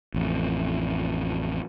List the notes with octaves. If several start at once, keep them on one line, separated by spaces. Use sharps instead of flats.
A1 F2